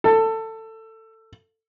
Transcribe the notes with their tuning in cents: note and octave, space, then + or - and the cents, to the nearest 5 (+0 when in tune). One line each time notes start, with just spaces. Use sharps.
A4 +20